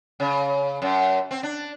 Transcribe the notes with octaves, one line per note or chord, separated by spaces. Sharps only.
C#3
F#2
C4
D4